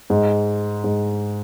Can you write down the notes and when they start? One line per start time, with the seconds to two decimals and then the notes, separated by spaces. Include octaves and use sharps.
0.10 G#2
0.84 G#2